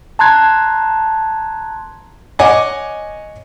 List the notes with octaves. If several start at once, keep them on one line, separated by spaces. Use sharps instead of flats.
A5 A#5 C6 F#6 G#6
C#5 D#5 F#5 G#5 D6